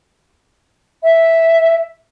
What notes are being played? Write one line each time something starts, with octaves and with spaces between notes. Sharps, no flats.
E5